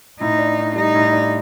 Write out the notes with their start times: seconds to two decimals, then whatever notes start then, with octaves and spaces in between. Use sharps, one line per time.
0.21 A2 D#4
0.39 D4
0.58 A2
0.76 G3 D#4
0.95 A2
1.13 D4